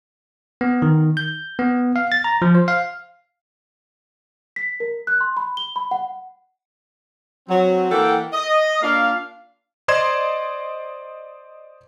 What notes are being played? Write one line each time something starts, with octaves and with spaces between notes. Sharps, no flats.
B3
D#3
G6
B3
F5
A6
A#5
F3
C5
F5
B6
A#4
F#6
C6
B5
G7
B5
F#5
F#3 C4
E3 A#3 A4 F#5 G5
D#5
A#3 D4 F4 F5
C5 D5 D#5 C6 G#6 E7